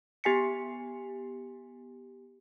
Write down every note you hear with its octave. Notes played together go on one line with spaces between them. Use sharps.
B3 G4 G#5 B6 C#7